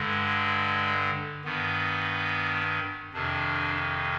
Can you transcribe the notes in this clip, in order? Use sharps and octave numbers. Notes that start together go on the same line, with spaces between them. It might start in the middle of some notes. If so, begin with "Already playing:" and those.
Already playing: G2 D3 G#3
G2 D#3 B3
F2 C3 D#3 D4